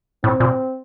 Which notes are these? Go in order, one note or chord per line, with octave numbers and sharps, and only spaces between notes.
A2 C4
A#2